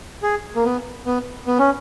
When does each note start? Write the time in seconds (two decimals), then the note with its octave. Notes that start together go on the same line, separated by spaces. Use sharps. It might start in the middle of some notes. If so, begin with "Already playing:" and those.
0.23 G#4
0.55 A#3
0.65 B3
1.06 B3
1.47 B3
1.59 C#4